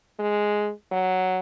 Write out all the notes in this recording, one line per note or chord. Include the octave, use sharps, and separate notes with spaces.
G#3
F#3